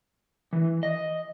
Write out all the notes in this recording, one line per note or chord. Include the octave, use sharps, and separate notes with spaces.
E3
D#5